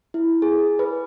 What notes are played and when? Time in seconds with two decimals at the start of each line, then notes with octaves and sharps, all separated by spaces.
0.14 E4
0.42 G#4
0.79 B4